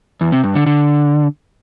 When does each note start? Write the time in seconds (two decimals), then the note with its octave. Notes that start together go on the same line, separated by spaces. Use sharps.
0.21 E2
0.32 C3
0.44 G2
0.55 D3
0.66 D3